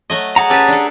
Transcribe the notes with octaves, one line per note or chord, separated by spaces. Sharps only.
F#3 A3 D#5
G#4 F#5 A5 A#5
C#4 G4 B4 A5
D4 A4